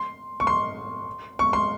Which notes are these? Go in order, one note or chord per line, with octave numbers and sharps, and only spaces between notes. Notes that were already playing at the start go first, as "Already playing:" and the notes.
Already playing: C6
C#6
C6
C#6
C6